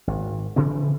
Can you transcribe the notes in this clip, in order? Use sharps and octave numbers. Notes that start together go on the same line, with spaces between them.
G#1
C#3 E3 F3 C4